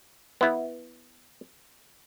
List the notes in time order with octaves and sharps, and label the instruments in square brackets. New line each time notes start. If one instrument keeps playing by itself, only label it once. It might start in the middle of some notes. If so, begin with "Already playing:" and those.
[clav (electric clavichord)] B3 E4